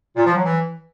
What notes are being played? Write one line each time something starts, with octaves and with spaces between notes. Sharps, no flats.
A#2
F3
F#3
E3